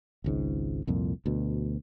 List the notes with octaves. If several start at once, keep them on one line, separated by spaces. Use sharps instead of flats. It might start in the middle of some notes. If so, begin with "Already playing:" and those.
G#1 C#2 G#2
C2 F2 A#2
D2 B2